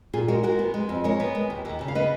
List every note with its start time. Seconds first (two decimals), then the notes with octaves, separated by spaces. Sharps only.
0.13 A#2 F4 G#4
0.28 G#3 F#4 A#4
0.43 G#3 F#4 A#4
0.59 B3
0.74 G#3
0.89 F2
1.04 G#3 A#4 C#5
1.20 B3
1.35 G#3
1.50 D#2
1.65 D#2
1.81 C#3
1.88 F5
1.95 B3 B4 D#5